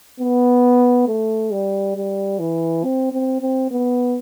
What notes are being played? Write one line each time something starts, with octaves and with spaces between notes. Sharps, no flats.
B3
A3
G3
G3
E3
C4
C4
C4
B3